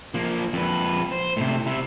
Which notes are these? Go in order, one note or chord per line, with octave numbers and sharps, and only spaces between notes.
F3 A#3
F2 B4
C5
A2 C3
C3 E4